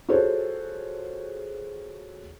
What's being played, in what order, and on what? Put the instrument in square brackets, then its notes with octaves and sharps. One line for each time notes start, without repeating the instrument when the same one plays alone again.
[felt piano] F4 F#4 G#4 A4 C5 C#5